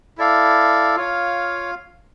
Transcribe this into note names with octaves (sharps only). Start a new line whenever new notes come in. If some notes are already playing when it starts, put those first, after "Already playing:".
E4 A4 D5 F5
F4 C#5 F5